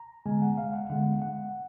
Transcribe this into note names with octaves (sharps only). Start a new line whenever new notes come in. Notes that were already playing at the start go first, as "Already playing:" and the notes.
Already playing: A#5
D3 G#3 B3 G#5
F#5
F5
F#5
D3 G#3 B3 F#5
F#5